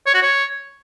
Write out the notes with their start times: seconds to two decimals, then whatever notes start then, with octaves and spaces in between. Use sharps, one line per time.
0.06 C#5
0.14 F#4
0.22 C#5